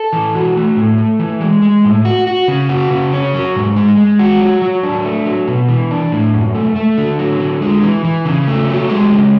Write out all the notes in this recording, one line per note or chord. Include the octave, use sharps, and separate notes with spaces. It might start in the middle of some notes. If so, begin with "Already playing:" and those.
Already playing: A4
E3
F#4
A3
A2
A3
E3
G#3
G#3
A2
F#4
F#4
C#3
F#4
C#3
C#4
F#3
G#2
G#3
G#3
F#4
F#3
F#3
D4
A3
F#3
B2
E3
D4
A2
F#2
A3
A3
D3
F#3
D3
G#3
E3
E3
C#3
A3
F#3
G#3
C#3